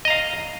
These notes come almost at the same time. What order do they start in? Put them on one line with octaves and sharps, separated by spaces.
D#5 A#5 F5